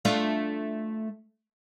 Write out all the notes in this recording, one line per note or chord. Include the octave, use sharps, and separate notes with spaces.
A3 D4 F4